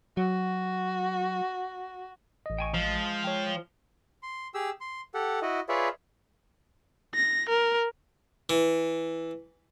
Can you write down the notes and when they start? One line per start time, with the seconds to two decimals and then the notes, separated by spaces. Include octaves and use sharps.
0.17 F#3 F#4
2.46 A1 D#5
2.58 G5 G#5 C#6
2.74 F3 G#3
3.24 C#5 G5
4.23 C6
4.54 G4 G#4 E6
4.81 C6
5.14 G4 A4 F#5
5.42 E4 F#4 D#5
5.69 F4 G#4 B4 C#5 D5 E5
7.15 A#6
7.49 A#4
8.50 E3